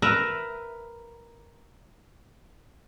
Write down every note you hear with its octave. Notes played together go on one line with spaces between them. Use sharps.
A#4 B4 E5